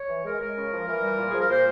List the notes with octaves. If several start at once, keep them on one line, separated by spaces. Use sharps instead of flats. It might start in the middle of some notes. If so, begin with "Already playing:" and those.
Already playing: C#5
E3
G#3 A#4
G#3 A#4
C#3
F3
E3 A#4
G3
A#2
F3 G#4
A#4
A#2 C5